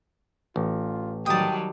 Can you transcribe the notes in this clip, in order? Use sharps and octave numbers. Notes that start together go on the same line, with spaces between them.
A1 F4
D#3 F#3 G3 G5 A5 D#6